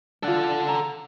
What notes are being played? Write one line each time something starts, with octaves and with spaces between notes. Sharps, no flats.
D4 F4 A4 F#5
A#5